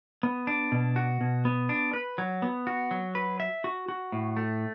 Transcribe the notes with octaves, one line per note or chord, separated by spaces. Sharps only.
B3
D4
B2
F#4
B2
B3
D4
B4
F#3
B3
F#4
F#3
B4
E5
F#4
F#4
A2
A3